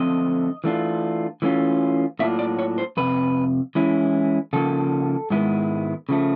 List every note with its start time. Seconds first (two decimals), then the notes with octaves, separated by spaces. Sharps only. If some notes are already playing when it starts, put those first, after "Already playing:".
Already playing: D3 F3 A3 C4 D#5
0.64 E3 A3 D4 F4
1.42 E3 A3 C#4 F4
2.19 A2 F#3 A#3 D4 F4 E5
2.39 D5
2.59 C#5
2.78 C5
2.97 F2 C3 B4
3.75 E3 G#3 C#4 E4
4.53 C#3 F3 A#3 D#4 A4
5.30 G#2 D#3 G#3 B3 E4
6.09 C#3 F3 A3